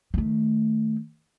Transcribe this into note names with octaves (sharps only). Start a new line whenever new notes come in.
D#3 A3